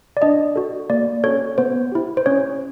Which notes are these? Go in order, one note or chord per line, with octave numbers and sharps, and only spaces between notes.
D5
D4 D#5
F#4 A4
A#3 D5
C#4 F#4 A4 C#5
B3 C5
E4 G4
C5
C#4 C#5